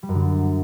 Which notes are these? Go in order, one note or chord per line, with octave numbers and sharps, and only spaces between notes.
G3
F#2
D3